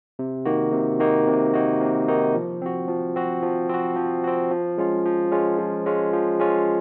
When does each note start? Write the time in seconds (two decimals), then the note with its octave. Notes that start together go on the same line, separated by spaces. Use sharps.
0.19 C3
0.45 D#3 A#3 D#4 F#4
0.73 C3
0.99 D#3 A#3 D#4 F#4
1.27 C3
1.54 D#3 A#3 D#4 F#4
1.81 C3
2.08 D#3 A#3 D#4 F#4
2.35 F3
2.62 C4 F#4
2.88 F3
3.16 C4 F#4
3.43 F3
3.69 C4 F#4
3.96 F3
4.24 C4 F#4
4.51 F3
4.78 G#3 C#4 F4
5.05 F3
5.32 G#3 C#4 F4
5.58 F3
5.86 G#3 C#4 F4
6.13 F3
6.40 G#3 C#4 F4